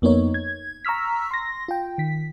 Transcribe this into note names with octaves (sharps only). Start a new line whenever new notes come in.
F2 A#3 B3 D#4 C#5
G#6
A#5 C#6 E6 F6 B6
C6 A#6
F4 G5
D#3 B6